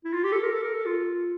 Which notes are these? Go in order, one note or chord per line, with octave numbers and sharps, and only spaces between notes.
E4
F4
G4
A4
A#4
A4
A#4
A4
F4